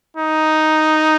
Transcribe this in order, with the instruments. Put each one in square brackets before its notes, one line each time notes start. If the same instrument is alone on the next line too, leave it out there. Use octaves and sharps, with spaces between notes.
[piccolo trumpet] D#4